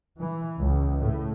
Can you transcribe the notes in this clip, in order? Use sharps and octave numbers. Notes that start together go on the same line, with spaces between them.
E3
C#2
A2